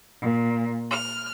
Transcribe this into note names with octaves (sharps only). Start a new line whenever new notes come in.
A#2
F6